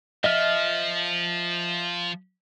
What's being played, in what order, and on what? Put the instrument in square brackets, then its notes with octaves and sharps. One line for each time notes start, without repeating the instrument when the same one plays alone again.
[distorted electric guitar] F3 F4 [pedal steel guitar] D#5 E5 F6